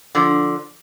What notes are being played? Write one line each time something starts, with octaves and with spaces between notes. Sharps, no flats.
D3 F3